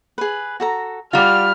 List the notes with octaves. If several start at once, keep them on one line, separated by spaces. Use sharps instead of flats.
G#4 B4
F#4 A4 A#5
G3 F4 F#4 D5 F6